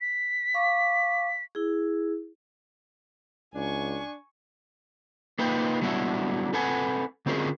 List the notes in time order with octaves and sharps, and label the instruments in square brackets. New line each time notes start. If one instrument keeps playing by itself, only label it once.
[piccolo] B6
[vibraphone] F5 C#6 D6
E4 G#4
[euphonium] C#2 [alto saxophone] D4 [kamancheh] G#5 C#6
[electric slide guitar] A#3 D#4 F4 B4 G5
F#3 G3 B3 D4 E4 E5
C4 A4 B4 F#5 G#5
D3 C4 C#4 F4 G#4 A#4